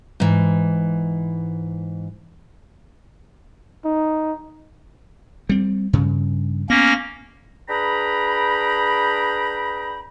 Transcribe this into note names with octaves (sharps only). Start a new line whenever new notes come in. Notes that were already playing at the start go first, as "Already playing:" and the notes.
G#2 E3
D#4
G3 C4
G2 C#3
A#3 B3 C#4 A#6
D4 G#4 B4 G5 A#5 B5